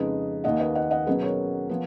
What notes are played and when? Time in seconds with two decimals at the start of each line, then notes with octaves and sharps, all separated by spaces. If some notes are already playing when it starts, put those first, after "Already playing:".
Already playing: F2 C#3 G#3 D#4 B4 D#5
0.44 D#2 D#3 A#3 D#5 F#5
0.60 B4 D#5
0.75 D#5 F#5
0.91 D#5 F#5
1.07 B2 F#3 C#4 G#4 B4
1.22 A#4 C#5
1.69 F3 B3